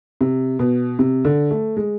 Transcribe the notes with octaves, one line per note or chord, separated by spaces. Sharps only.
C3
B2
C3
D3
A3
G#3